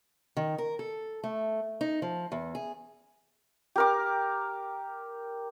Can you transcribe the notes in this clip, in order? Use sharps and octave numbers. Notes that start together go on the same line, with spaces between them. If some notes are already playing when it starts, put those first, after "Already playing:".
D#3
A#4
A4
A3
D#4
F3
E2
G#4
G4 A#4 D6